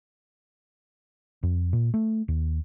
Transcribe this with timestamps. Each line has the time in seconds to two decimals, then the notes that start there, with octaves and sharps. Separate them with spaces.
1.43 F2
1.73 A#2
1.94 A3
2.28 D#2